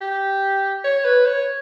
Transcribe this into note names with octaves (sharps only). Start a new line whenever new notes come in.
G4
C#5
B4
C#5